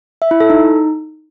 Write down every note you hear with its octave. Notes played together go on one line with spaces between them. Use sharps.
E5
E4
A4
D#4